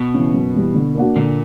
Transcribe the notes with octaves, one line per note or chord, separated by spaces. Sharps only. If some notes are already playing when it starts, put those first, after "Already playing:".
Already playing: B2 B3
C#3 E3
F#2
E3 G3
D3
A#3 D4 F#4
A#2 D3 A#3